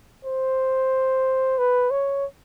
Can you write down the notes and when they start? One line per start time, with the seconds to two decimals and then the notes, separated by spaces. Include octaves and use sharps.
0.25 C5
1.58 B4
1.91 C#5